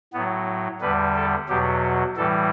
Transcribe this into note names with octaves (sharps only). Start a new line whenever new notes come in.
A2 F#3 B3
E2 D3 G3 B4
A4
E2 B2 F#3 G4
A2 E3 G3 A4